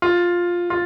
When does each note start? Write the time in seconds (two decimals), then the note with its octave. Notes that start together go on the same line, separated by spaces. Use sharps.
0.02 F4
0.70 F4